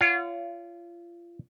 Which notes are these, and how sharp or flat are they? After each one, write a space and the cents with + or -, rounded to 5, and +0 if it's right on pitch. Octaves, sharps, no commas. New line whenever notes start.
F4 -30 C#5 +30 F#5 -35